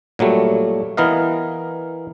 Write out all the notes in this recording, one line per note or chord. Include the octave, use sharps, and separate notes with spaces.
A#2 F#3 G3 A3
E3 B3 A#4 D#5 F5